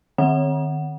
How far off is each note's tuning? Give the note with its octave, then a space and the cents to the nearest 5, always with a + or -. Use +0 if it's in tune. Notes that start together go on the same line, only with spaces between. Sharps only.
D#3 -40 C4 +0 F#5 +5